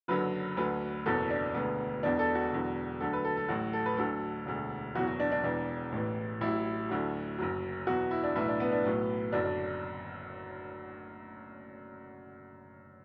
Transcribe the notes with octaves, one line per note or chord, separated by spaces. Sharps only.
F#1 F#2 D3 F#3 B4
D2 D3 F#3 B4
F#1 E2 B2 F#3 A4
D4
E1 D2 D3 B3
E1 E2 B2 D4
A4
F#4
E1 E2 D3 F#3
D2 D3 F#3 A4
B4
A4
A4
A1 A2 F#3 F#4
A4
B4
D2 D3 F#3 A4
E1 D2 D3
F#1 E2 B2 F#3 F#4
F#4
D4
D4
E1 E2 E3 D4
A1 A2 E3
A1 A2 F#3 E4
D2 D3 F#3
F#1 F#2 F#3
E2 B2 F#3 F#4
E4
D4
B1 A2 E3 E4
D4
B3
D4
B1 A2 F#3 B3
F#1 F#2 D3 F#3 D4
D4